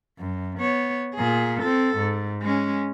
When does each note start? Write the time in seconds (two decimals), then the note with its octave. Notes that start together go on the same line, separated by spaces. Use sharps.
0.18 F#2
0.59 B3 C#5
1.15 A#2 G#4
1.61 C4 A4
1.96 G#2
2.42 G#3 C#4